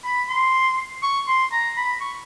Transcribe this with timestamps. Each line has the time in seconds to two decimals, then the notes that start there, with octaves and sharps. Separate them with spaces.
0.04 B5
0.29 C6
1.03 C#6
1.28 C6
1.52 A#5
1.77 B5
2.01 C#6